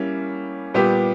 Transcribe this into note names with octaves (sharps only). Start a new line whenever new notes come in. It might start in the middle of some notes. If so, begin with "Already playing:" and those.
Already playing: G3 A#3 C#4 E4
A#2 G3 B3 G4